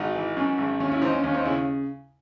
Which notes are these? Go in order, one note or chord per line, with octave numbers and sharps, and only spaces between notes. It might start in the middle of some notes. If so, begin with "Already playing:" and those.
Already playing: G#1 D#4 F#4
E3
F#2
G#1
D#2 C#4
C#4 E4
D#2 C4 D#4
C#4
D#2 C#4
C4 D#4
C#3 C#4 E4